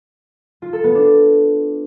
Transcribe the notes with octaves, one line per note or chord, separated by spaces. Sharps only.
F4
A4
B3
D4